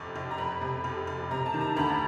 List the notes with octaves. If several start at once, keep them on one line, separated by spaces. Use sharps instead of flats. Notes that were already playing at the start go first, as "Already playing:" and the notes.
Already playing: F1 F2 C3 C#6
F1
A#5
F2 B5
C3
F1
F1
C3 A#5
A5
D#3
A#5
D2 B5